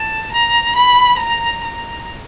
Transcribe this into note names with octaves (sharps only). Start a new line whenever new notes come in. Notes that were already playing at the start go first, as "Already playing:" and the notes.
Already playing: A5
A#5
B5
A#5
A#5